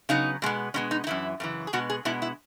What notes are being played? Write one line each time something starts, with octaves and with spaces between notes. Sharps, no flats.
C#3 F#3 B3 D#4
B2 G#3 B3
B2 G#3 B3 C#4
D#4
D#4
F#2 C#3 E3 E4
F#2 C#3 E3
G#4
B2 G#3 B3 F#4
G#4
B2 G#3 B3 E4
E4